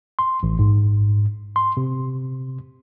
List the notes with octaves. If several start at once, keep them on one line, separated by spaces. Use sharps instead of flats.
C6
A1
G#2
C6
C3